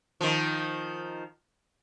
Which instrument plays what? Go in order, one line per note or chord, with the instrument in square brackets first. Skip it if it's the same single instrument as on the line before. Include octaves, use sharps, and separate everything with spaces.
[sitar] D#3 F3